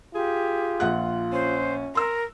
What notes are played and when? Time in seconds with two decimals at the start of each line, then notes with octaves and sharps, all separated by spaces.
0.15 F4 G4 G#4
0.80 A#1 F#5 F#6
1.32 C#4 C5
1.95 A#4 C6 E6